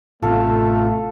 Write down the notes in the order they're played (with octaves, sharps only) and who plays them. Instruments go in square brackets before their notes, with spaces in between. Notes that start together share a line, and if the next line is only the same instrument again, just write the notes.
[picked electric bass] A1 C3 B3 [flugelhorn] A3 [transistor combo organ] F4 [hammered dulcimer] A4 F5